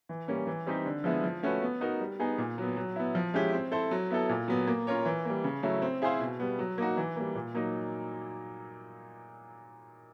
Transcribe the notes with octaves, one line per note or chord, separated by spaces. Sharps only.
E3
G3 A#3 C#4
E3
G3 C4 D#4 G4
D3
F3 G#3 B3 E4
F3
A3 C#4 F#4 B4
B3
D#4 F#4 A#4
G3
B3 D#4 G#4
A#2
F#3 B3
F#3
B3 E4
F3
G#3 C#4 E4 G4
C4
E4 A4 C5
F#3
B3 E4 A4
A#2
F#3 B3
A#3
C#4 F4 A#4 C#5
E3
G3 A#3
C#3
F#3 A3 C#4 E4
C4
E4 G#4 C5 F5
B2
G3 B3
F#3
A#3 D#4 F#4
E3
G3 A#3
A#2
F#3 A#3 D#4